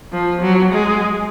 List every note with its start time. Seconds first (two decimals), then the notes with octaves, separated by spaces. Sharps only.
0.12 F3
0.41 F#3
0.72 G#3